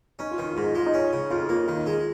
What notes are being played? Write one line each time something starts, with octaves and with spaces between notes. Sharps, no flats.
C#4 D#4
F4
D#3 D#4
G#2 F4
D#4
G#3 F4
D#4
C#4
C#3
F2 F4
A#3 F4
D#3 F4
D#4
G#3 F4